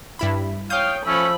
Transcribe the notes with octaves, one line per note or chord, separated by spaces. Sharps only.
G2 E4 B5
C#5 F5 G5 D#6 G6
F3 A3 C#4 B5 E6